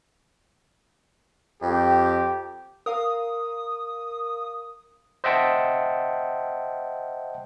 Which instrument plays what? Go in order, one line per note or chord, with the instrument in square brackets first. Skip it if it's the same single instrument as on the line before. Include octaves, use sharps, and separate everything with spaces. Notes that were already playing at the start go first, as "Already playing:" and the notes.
[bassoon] F2 [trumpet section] G4
[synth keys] A#4 F5 [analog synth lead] D#6
[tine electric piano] C5 D#5 E5 F#5 G5 A5